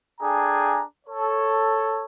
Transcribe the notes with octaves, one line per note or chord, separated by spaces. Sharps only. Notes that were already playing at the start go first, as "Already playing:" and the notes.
D4 G#4 A4 G5 G#5 A#5
A4 C#5